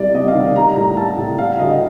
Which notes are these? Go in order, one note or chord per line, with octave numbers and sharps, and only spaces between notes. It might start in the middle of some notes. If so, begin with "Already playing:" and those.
Already playing: C2 G3 D5
C3 D#5
F5
D#3
G3 A#5
A2 A#5
G3 A5
A2
G3 F5
D2 D#5